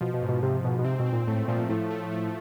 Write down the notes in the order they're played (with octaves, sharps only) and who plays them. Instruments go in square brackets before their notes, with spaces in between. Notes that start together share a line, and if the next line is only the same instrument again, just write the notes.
[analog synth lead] B2 [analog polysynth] F3
[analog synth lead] B2
[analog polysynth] G#2
[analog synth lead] B2
[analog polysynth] G#2 [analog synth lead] C3
[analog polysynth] G#2 [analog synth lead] B2
[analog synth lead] B2
[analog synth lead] C3 [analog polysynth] C4
[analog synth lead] B2
[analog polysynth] C4
[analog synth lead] A#2
[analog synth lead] A2 [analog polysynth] A3
[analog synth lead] A#2 [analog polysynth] F3
[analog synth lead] A2 [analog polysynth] A3
[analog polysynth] A3
A3